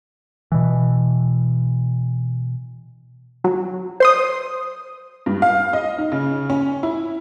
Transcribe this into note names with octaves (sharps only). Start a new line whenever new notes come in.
B2 E3
F#3
C5 C6 D#6
G2
F5
D#5
D#4
C#3
C#4
E4